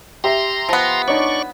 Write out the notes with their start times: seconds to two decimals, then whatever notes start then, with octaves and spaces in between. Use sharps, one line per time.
0.24 G4 E5 A#5 C6
0.69 F3 B3
1.08 D4 D#4 C#5 D5 C#6